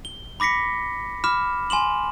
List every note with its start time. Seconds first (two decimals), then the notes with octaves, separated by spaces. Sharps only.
0.05 G7
0.40 B5 D6 A#6 B6 C#7
1.24 B5 D6 F6 E7
1.70 G#5 C6 E7 F#7